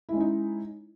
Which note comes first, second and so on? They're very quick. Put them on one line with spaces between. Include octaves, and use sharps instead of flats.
E4 G#3 C#4 D#4